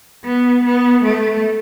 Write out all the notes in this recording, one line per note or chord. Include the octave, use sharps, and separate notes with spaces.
B3
B3
A3